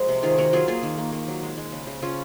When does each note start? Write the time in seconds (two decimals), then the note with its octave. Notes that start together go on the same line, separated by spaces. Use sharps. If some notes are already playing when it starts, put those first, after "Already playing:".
Already playing: F3 G#3 F#4 A#4
0.09 C3
0.23 D#3 F4 G#4
0.38 D#3 F#4 A#4
0.53 F#3 F4 G#4
0.68 A#3 F4 G#4
0.83 D#3
0.98 A#3
1.12 A#3
1.28 F#3
1.43 G#3
1.58 G#3
1.72 C#3
1.87 C#3
2.02 C#3 C#4 F4